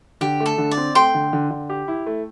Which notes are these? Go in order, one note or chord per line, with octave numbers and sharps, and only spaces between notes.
D3 G4
A3
A4
D3
D5
C4
A3 G5 C6
D3
D3
D3
G4
E4
A3